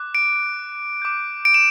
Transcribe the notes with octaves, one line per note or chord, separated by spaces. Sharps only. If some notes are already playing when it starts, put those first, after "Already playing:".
Already playing: D6 F#6
D7
D6 G6
D7
E7